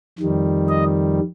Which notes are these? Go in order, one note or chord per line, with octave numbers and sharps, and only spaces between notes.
F2 D#3 G3
D#5